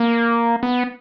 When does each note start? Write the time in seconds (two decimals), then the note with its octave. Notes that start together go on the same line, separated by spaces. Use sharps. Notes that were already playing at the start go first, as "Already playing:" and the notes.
Already playing: A#3
0.63 B3